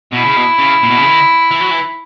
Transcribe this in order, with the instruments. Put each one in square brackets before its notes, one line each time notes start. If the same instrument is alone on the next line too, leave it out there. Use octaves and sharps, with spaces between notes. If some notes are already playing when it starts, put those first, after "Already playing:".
[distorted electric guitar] B2 [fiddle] E4
[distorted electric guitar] C#3
B2
C#3
A#2
B2
C#3
D#3
E3
F#3
E3